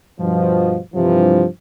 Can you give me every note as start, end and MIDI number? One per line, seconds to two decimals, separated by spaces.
0.20 0.78 43
0.20 0.78 47
0.20 0.78 53
0.94 1.44 43
0.94 1.44 48
0.94 1.44 52
0.94 1.44 53